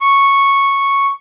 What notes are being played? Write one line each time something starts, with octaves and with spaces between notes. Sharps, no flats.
C#6